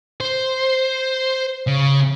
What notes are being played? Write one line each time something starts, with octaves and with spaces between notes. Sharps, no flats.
C5
C#3